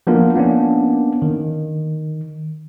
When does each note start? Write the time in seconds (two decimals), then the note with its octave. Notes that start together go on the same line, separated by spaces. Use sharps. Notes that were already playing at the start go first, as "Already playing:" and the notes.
0.07 F3 A#3 B3 D4 F4 A#4
0.35 A#3 B3 C#4 D4
1.22 D#3